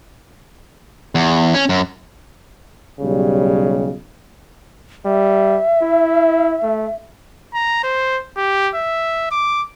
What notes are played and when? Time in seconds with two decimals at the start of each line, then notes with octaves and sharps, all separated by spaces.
1.15 E2
1.54 C#4
1.69 F#2
3.01 B1 C#3 G3
5.05 G3 E5
5.81 E4
6.63 A3
7.54 A#5
7.84 C5
8.37 G4
8.75 E5
9.31 D6